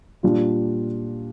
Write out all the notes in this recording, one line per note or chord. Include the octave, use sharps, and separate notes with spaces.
A#2 G3 D4 F4